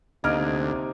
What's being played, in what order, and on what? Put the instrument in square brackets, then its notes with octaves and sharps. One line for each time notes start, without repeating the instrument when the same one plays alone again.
[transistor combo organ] D2 [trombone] C3 [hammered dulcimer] A#3 D#4 [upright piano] D#5 F6 D7